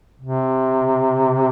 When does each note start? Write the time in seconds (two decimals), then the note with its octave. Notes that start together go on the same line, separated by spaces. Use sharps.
0.22 C3